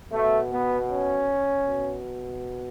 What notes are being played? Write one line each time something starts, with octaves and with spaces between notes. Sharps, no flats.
B2 A3
B3
C#4
B2